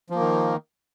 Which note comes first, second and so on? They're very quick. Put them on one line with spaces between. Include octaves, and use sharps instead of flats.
F3 A#3 D#3